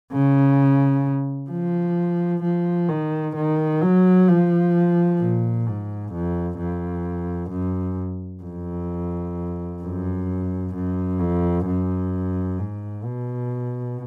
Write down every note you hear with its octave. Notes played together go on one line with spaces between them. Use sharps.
C#3
F3
F3
D#3
D#3
F#3
F3
A#2
G#2
F2
F2
F#2
F2
F#2
F#2
F2
F#2
G#2
B2